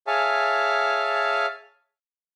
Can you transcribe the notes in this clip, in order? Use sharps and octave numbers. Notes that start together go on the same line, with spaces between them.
G#4 C#5 E5 F5 G#5 A5